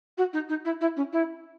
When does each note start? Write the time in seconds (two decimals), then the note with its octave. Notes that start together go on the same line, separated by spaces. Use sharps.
0.18 F#4
0.33 D#4
0.49 D#4
0.65 E4
0.81 E4
0.96 C#4
1.12 E4